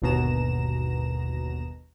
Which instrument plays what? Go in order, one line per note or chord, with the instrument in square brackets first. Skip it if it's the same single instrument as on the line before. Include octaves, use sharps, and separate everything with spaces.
[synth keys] G1 D#2 B2 A#5 E7